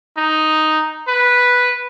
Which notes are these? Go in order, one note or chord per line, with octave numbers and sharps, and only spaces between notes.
D#4
B4